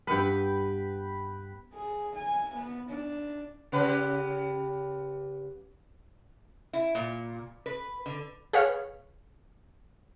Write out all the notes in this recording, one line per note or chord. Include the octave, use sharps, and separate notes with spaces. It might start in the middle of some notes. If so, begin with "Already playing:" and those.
G2 B3 B4 G5
G#4
G#5
B3
D4
C#3 G4 B4
E4
A#2
B4
D3
G#4 B4 C#5 F5